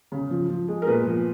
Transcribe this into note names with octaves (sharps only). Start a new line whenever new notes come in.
C#3
F3
F3
G#3
A#4
A#2 B3 B4
F3